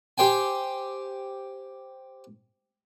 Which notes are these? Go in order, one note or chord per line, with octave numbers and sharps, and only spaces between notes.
G4 C5 G5 G#5